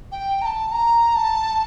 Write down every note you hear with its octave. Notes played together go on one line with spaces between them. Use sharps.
G5
A#5
A5
A#5
A5